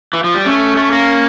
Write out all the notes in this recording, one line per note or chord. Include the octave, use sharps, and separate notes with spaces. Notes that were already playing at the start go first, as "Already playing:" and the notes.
E3
F3
G3
A3 C#4
A3
A#3